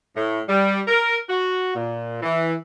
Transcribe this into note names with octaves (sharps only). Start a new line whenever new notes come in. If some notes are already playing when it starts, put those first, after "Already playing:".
A2
G3
A#4
F#4
A#2
E3